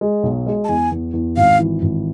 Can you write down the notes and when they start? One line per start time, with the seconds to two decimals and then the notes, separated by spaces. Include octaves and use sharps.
0.01 G#3
0.23 B1
0.47 G#3
0.64 A5
0.69 E2 G#5
0.91 E2
1.13 E2
1.37 G#1 F5
1.59 E3
1.82 G#1